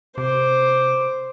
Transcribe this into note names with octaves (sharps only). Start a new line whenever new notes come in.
C3 C5 D6